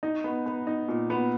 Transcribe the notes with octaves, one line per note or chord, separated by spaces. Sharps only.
D#4
B3
B3
D#4
A#2
B3